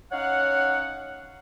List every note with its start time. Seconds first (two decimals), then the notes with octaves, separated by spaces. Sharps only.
0.12 C#4 D#4 C#5 F5 F#5